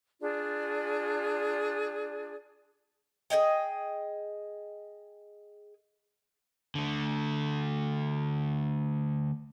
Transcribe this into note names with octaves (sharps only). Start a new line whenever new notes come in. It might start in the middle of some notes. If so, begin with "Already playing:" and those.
D4 F4 G#4 D5
G#4 C#5 D#5 G5
D3 A3